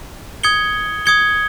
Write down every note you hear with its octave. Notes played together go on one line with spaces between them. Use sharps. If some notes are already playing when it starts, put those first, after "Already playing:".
D#6 G#6 C#7 G7
D#6 G#6 C#7 G7